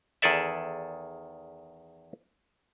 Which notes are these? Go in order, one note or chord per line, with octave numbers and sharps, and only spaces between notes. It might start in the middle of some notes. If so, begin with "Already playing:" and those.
E2 D#3 G#4 A4 D5 E5